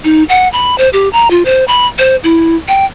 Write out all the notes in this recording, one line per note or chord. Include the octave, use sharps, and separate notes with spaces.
D#4
F#5
B5
C5
G4
A#5
F4
C5
B5
C5
E4
G5